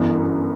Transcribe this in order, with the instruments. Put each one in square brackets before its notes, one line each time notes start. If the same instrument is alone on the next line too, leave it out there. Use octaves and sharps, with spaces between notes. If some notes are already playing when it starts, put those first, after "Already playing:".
Already playing: [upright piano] G1 F#2 E3 B3